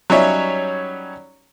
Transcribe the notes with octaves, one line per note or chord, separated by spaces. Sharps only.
F#3 G3 C#4 D#4 C#5 E5